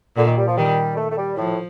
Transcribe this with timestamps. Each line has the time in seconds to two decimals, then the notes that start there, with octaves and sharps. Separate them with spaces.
0.16 A#2 D3
0.26 D#3
0.37 G3
0.47 F3
0.57 D#3 G3
0.97 A3
1.10 A3
1.17 G3
1.36 A2 F3